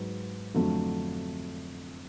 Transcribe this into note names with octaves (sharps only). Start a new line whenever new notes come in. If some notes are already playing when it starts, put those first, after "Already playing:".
Already playing: G#2 F#3 B3
F2 D3 F#3 A3